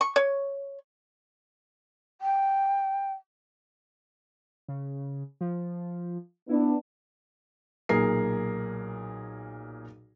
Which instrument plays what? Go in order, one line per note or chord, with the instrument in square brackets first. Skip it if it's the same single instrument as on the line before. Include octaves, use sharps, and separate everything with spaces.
[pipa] C#6
C#5
[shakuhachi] G5
[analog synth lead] C#3
F3
[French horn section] B3 D4 [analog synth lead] E4
[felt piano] B1 A#2 G#4 A#4 C7